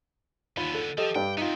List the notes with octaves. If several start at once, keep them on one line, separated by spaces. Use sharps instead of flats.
D#2 D3 B3 F4 B5
A4
F3 G4 A4 D#5
G2 D4 G4 G5
B3 C4 D#4 F4